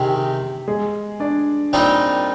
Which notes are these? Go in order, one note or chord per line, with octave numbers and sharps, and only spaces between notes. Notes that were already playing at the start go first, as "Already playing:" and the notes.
Already playing: C3 D#3 G#3 C4 G4
G4
G#3 G#4
D4 D5
A#2 G3 C4 D#4